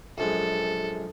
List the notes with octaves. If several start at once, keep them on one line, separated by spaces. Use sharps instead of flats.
A#1 F#2 G#3 A4